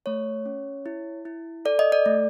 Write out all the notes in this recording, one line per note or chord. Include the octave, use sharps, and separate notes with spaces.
A3 C#5
C#4
E4
E4
A4 D5
D#5
D5
A3